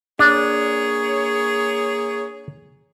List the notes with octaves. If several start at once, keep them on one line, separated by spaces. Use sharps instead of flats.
A#3 D4 G#4 C#5